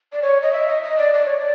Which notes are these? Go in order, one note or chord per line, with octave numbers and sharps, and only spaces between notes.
D5
C#5
D#5
E5
D#5
D#5
D5
D5
C#5
D5